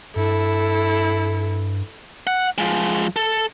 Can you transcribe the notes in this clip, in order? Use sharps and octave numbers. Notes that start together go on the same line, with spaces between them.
G2 E4 A4
F#5
F3 G#3
A4